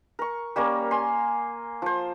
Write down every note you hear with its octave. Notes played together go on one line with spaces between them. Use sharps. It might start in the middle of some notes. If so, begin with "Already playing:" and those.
A#4 C#6
G3 A#3 C#4 A#4
G#5 C6
F3 C5